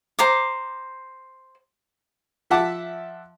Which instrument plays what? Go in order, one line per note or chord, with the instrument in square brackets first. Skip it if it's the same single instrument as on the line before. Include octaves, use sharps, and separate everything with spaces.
[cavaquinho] C5 A#5 D6
[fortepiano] F3 E5 F#5 A5 D6